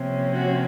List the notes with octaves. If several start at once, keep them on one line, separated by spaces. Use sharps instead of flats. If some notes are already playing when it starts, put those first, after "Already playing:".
Already playing: C3 F3 A#3 C#4
F#4